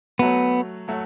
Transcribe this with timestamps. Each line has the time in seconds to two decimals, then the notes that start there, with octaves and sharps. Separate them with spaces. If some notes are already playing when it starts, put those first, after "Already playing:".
0.19 F#3 A3 B3 F#4
0.88 F#3 A3 F#4